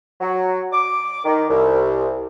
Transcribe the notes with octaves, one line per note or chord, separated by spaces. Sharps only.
F#3
D6
D#3
C2